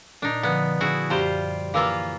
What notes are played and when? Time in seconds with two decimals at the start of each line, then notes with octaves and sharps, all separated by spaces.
0.22 A#2 D4 D#4
0.43 D3 F3 B3
0.81 E4 F#4 G#4
1.10 F#2 G3 F4 G4 C5
1.74 E3 A#3 F4 F5 D6 E6